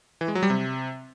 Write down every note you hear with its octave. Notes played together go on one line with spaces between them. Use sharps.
E3
G#3
F#3
G3
C3